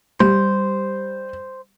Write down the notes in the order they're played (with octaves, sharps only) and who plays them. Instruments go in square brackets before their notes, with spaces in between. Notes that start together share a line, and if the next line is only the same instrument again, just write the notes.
[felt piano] G3 [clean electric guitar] C5